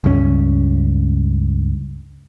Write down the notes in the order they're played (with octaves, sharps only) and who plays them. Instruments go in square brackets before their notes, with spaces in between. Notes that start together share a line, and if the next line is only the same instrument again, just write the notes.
[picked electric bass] C#2 G2 F#3 C#4